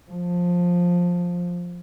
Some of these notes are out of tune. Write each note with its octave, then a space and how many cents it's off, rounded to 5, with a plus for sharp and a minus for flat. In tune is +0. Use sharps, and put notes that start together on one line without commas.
F3 +10